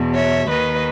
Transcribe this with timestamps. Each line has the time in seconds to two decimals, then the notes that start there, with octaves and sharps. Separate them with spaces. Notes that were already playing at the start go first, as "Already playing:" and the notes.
Already playing: E2 B2
0.15 C#5 E5
0.49 D#2 D#3 B4 D#5